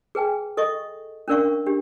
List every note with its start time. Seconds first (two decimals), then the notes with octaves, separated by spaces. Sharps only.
0.15 G#4 B4 G5 G#5
0.57 A4 D#5 E5 C#6
1.28 C#4 D4 A#4 D5 F5 C#6
1.66 D4 G4